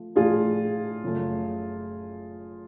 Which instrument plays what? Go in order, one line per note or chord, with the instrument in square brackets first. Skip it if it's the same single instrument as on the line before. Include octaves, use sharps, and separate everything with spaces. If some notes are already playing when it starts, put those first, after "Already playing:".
Already playing: [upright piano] F3 A3
[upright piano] A2 F3 A3 D4 [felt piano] F4 G#4
[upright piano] F#1 F#2 F3 A3